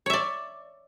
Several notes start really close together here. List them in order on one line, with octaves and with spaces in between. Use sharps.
C#5 E5 D5